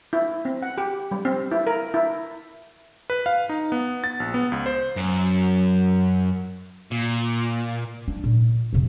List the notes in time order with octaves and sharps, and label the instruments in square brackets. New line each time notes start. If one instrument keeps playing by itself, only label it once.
[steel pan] E4
C4
F#5
G4
G3
C4
E4
A#4
E4
[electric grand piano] B4
F5
D#4
B3
A6
A#1
B3
C#2
C5
[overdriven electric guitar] F#2
A#2
[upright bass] D4
A#2
F2 C3